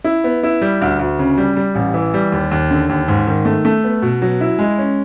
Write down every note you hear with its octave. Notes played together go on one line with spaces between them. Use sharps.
E4
B3
E4
G3
D2
D2
C#3
G3
G3
A1
E3
G3
D#2
D#2
D3
D#2
G#2
D#3
A3
A3
B3
B2
F#3
E4
G#3
C#4